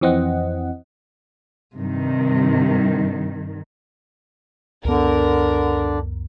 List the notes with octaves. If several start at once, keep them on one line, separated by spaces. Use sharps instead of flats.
F2 E3 C4 D#5 F#5
G2 C3 D#3
C#2 F#2 D3 B3 A#4